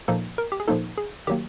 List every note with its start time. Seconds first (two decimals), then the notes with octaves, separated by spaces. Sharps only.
0.08 A#2 F3 A#3 D#4 A4
0.38 A#4
0.52 G4
0.60 G#4
0.68 A#2 F3 A#3 D#4 A4
0.98 G#4
1.27 D#3 F#3 A#3 G4